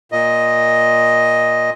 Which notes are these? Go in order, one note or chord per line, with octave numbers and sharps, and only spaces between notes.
A#2 D#5